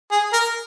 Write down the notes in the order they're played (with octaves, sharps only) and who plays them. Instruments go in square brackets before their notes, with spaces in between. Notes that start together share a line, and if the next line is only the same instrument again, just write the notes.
[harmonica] G#4
A#4